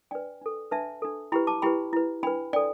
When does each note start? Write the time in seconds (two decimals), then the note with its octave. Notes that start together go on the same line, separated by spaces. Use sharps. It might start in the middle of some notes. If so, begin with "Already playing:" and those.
0.11 D4 B4 D5 G5
0.41 D4 A4
0.71 D4 B4 E5 A5
1.02 D4 A4
1.32 E4 G4 B4 G5 B5
1.47 A5 D6
1.62 E4 G4 B4 G5 B5
1.93 E4 B4
2.23 D4 B4 G5 B5
2.53 D4 A4 D5 G5